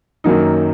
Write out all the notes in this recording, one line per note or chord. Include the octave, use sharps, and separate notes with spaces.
F#2 D#3 F#3 A#3 D#4